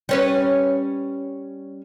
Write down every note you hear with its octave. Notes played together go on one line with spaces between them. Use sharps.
G3 C#4 B4